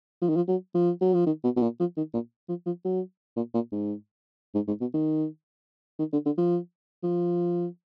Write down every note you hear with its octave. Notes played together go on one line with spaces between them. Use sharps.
F3
D#3
F3
F#3
F3
F#3
F3
D#3
B2
B2
A#2
F3
D#3
A#2
F3
F3
F#3
A#2
A#2
G#2
G#2
G#2
B2
D#3
D#3
D3
D3
F3
F3